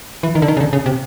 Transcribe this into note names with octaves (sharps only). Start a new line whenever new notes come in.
E3
D#3
D3
D#3
C#3
D3
C#3
C3